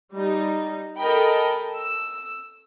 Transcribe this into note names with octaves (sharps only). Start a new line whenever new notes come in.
G3 D#4
A4 A#4 D#5 G5 B5
E6